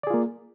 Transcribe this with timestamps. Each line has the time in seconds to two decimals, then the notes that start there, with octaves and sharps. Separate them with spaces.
0.03 D5
0.07 G#4
0.10 F4
0.14 A#3